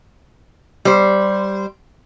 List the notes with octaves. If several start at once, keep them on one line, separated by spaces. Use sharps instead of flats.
G3 C5